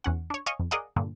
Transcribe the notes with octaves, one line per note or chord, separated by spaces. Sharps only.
E2 C#4 F#5
D4 C#5
C#5 D#5 F5 G#5 C#6
F2
G#4 A#4 D5 D#5 F5 F#5
G2 A#2 D3